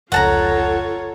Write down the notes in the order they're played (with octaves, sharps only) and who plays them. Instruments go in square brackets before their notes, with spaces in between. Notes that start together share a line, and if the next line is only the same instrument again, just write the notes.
[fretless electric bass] F1 C#2 [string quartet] F4 A4 C#5 [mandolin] F#5 A5 A#5